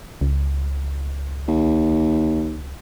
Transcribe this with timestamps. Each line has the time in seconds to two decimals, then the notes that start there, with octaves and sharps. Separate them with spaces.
0.21 C#2
1.48 D#2